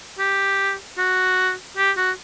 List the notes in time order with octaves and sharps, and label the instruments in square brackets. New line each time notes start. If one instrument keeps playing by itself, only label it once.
[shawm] G4
F#4
G4
F#4